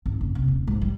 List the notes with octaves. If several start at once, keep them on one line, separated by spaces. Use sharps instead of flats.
G#1
F#1
C3
D#1
G#2
G3